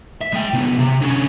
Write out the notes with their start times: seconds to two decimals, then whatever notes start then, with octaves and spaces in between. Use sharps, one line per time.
0.21 E5
0.33 G#3 G5
0.53 C2 B3
0.79 C3
1.01 D3 C#4